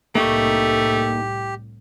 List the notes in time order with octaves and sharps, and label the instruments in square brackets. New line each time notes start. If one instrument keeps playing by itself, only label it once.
[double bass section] C2 A2 [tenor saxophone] A3 [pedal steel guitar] A#3 D#4 C#6 [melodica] G4